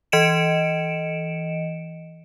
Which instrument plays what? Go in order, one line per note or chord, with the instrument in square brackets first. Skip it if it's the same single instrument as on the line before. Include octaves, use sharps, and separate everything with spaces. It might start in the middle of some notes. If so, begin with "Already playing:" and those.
[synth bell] E3 D#5 C#7 D7 E7